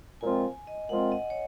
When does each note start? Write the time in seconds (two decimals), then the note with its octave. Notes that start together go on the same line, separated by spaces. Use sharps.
0.21 A#2 F3 G#3 C4 F4 G#5
0.67 D#5
0.89 A#2 F3 G#3 C4 F4 F#5
1.12 D#5
1.30 C#5